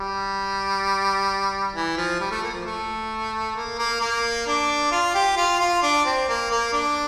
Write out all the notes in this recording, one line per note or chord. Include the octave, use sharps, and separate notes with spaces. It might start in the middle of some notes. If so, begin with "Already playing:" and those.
Already playing: G3
E3
F3
G3
A3
A#3
F3
A3
A#3
A#3
A#3
D4
F4
G4
F4
F4
D4
C4
A#3
A#3
D4